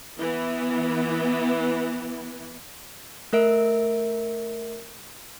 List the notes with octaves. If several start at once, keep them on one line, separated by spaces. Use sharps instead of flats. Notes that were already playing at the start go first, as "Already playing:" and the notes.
E3 B3
A3 A#4 E5 D7